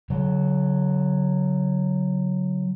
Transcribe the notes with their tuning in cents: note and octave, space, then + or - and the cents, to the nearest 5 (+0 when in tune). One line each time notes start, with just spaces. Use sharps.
D3 -45 F#3 +0